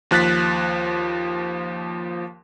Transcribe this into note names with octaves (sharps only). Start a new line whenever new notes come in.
D#2 F3 F#6 A6 B6